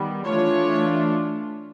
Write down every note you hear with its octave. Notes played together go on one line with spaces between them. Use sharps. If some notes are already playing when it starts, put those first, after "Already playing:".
Already playing: D#3 G3 B3
E3 A3 D4 F4 C#5